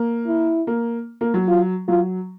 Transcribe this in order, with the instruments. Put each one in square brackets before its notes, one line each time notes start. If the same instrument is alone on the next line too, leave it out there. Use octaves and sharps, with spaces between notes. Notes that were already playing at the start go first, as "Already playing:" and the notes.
Already playing: [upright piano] A#3
[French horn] E4
[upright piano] A#3
A#3
F#3
[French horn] F4
[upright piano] F#3 [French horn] F4